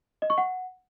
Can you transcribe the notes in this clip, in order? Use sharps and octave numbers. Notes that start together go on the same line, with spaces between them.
D#5
C#6
F#5